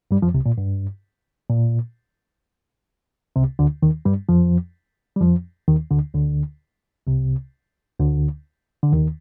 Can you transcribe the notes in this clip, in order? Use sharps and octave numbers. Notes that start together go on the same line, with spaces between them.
G2 G3
F2 F3
C2 C3
A#2
G2
A#2
C2 C3
D2 D3
D#2 D#3
G2 G3
F2 F3
G3
F2 F3
D#2 D#3
D2 D3
D2 D3
C2 C3
D2 D3
D3
D#2 D#3